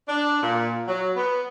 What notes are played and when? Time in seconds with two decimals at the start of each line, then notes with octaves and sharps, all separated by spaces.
0.08 D4
0.43 A#2
0.88 F#3
1.16 B3